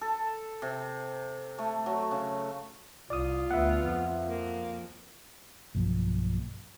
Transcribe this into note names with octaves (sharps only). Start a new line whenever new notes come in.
A4
C3
A3
F#3
C#3
C2 F4 D5 D#6
D2 B3 E5 F#5
F2
A#3
B1 G2 F3 A#3